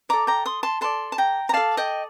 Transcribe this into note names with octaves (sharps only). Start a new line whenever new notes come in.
A4 D5 A#5 D6
G5 A#5
C6 D#6
A5 C6
A4 D5 A5 C6
A5
G5 A#5
A#5
A4 D5 F5 A5
D#5 G5